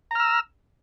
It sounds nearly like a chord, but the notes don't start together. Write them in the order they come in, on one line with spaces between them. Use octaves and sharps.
A#5 F6 E6